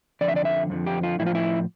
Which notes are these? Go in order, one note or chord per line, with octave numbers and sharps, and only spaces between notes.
F2 D3 F3 D5
E5
D5
E5
F2 D3 F3
G4
F4
A2 F3 E4
F4
E4